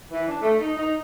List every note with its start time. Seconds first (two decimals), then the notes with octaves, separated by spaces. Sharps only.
0.11 E3
0.28 D4
0.41 A3
0.59 D#4
0.77 D#4